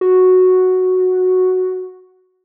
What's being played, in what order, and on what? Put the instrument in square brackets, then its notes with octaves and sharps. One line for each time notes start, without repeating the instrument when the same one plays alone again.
[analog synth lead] F#4